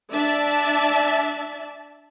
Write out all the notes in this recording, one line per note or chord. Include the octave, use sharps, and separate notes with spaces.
D4 D5 E5 A5